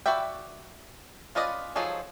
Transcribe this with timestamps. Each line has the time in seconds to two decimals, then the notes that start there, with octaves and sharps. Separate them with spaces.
0.06 F#4 B4 D5 E5 G5
1.35 C#4 F4 B4 D5 D#5
1.76 F3 F#3 D#4 G#4 A4